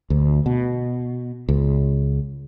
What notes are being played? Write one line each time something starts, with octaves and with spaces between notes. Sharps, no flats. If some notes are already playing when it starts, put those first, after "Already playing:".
D2
B2
C#2